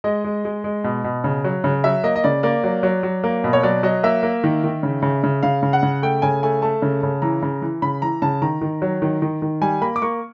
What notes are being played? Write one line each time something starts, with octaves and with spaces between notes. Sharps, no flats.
G#3 D#5
G#3
G#3
G#3
B2
B2
C#3
F#3
C#3
F#3 E5
A#3 D#5
D#5
C#3 D5
A#3 D5
F#3
F#3
F#3
A#3
B2
C#5
F#3 D5
F#3 D#5
A#3 E5
A#3
D#3
D#3
C#3
C#3
C#3
C#3 F5
C#3
F#5
C#3
A3 G5
C#3 G#5
A3 G#5
A3 A5
C#3
C#3
E3 A#5
C#3
E3
C#3 B5
E3 A#5
C#3 A5
D#3 A#5
D#3
F#3
D#3
D#3
D#3
G3 G#5
A#3 B5
D6
A#3 C#6